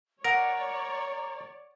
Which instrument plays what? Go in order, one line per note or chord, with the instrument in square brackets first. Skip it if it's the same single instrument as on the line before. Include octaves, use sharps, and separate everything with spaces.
[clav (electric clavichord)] A#4 [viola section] C#5 D5 [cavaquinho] F#5 [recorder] A#5